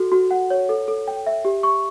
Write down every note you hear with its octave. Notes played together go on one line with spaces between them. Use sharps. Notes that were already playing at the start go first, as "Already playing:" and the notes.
Already playing: F#4 A4
F#4
F#5
C#5
A4
A4
G5
E5
G4
C#6